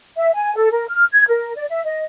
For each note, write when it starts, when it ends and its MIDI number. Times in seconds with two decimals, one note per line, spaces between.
0.16 0.30 76
0.33 0.53 80
0.55 0.71 69
0.72 0.86 70
0.88 1.04 89
1.12 1.23 92
1.28 1.55 70
1.56 1.65 74
1.69 1.80 76
1.84 2.03 75